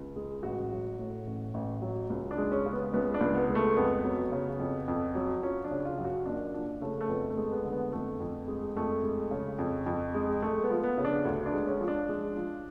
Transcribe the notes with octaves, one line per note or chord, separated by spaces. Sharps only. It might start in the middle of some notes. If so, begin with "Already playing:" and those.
Already playing: C#2
G#3
A1 F#4
F#3
A2
A1
A1
F#3
C#2
D4
G#3
C#4
C#3
B3
C#2 B3
D4
C#2
B3
G#3
A3
F2 B3
F#3
C#3
F2
F2
F#3
F3 C#4
D4
C#3
F4
F#2
F#4
F#1 D4
F3 D4
C#3 A3
A3
F2 B3
A3
G#3
B3
D3
B3
F2 A3
F2
G#3
F2 A3
G#3
C#3
F2
F2
G#3
G#3 A3
B3
F3
B3
C#3
D4
D2
D4
G#3
C#4
F3
D4
G#3
F3